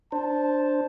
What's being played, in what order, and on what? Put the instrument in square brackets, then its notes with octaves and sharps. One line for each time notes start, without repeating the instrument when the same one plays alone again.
[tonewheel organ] D4 C5 [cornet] A5